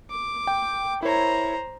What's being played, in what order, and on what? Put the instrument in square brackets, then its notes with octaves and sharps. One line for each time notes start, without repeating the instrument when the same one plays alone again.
[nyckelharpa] D6
[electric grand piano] G5
[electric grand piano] E4 A#4 C#5 [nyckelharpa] C5 A#5